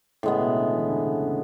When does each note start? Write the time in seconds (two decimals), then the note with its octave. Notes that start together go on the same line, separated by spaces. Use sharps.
0.23 A2 C#3 G#3 B3
0.40 B2
0.57 D3
0.73 E3
0.88 D3
1.05 C#3
1.22 C#3